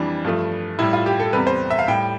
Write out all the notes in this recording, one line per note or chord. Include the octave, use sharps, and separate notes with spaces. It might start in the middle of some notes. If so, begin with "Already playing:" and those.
Already playing: F2 E3 G3 D4
G2 F3 A3
A2 G3 E4
F4
G4
A4
E2 C3 G3 B4
C5
E5
F5
A2 G3 G5